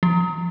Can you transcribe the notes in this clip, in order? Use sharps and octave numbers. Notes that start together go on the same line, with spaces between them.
F3